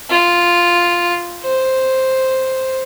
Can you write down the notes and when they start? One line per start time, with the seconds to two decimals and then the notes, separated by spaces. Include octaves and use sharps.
0.10 F4
1.43 C5